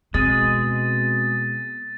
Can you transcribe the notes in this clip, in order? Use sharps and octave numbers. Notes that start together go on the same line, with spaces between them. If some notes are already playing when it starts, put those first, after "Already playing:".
B2 G#3 C4 G#4 A6 D#7